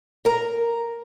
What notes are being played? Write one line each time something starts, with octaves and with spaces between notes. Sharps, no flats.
A#4 A#5